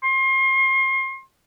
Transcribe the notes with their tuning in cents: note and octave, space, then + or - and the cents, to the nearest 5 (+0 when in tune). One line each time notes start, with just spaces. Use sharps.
C6 +35